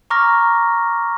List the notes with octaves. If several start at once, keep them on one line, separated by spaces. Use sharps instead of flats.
A#5 C#6 D6 F6 A#6